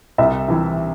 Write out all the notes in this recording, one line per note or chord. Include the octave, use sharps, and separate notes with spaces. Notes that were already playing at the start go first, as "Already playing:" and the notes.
C2 E5
C3 E3